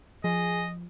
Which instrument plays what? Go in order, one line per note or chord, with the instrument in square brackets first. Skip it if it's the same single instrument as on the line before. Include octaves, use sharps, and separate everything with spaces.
[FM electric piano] F3 [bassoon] G#4 [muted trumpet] D#5